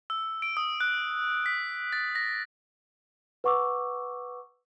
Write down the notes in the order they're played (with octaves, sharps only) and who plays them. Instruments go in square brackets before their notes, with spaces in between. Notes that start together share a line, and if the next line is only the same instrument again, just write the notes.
[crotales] E6
D7
D#6
F#6
B6
A6
A#6
[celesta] B4 F#5 C#6 D6 E6